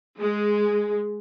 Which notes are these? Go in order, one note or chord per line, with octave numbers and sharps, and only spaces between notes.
G#3